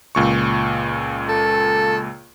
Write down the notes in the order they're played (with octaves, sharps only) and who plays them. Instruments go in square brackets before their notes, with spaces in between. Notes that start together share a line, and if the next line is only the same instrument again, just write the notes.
[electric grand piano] C#2 A#2 C#6
[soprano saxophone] A4